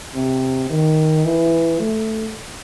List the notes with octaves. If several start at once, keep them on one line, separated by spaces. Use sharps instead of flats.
C3
D#3
E3
A3